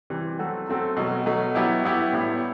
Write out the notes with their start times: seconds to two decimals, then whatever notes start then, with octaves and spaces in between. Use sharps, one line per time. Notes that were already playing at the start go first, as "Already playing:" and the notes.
0.10 C3 E3 G3
0.39 F#3 A3 C4 F#4 A4
0.67 F#3 A3 C4 F#4 A4
0.97 B2 F#3 A3
1.26 B2 F#3 A3
1.55 F#3 B3 E4 G4
1.84 F#3 B3 E4 G4
2.13 A2 G3 B3 E4